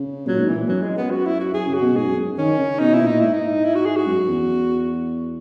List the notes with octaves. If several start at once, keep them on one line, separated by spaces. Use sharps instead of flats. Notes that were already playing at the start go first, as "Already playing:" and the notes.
Already playing: C#3
A#2 F#3
G#2
A#2 E3
F#2 F#3
G#3
B3
F#4
E4
F#4
F#2 G#4
C#3
F#4
B2
G#2 G#4
F#2
F#2
D#3 C#4
C#3
B2 D#4
E4
A#2
D#4
G#2 E4
D#4
E4
F#4
G#4
F#4
F#2
E2